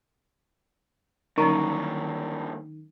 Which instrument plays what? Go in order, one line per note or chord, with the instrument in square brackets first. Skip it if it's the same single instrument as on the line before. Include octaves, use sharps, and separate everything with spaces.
[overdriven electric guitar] G2 A#3 [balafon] D3 F#3 C#4 [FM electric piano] D#3 [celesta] A#5 C#6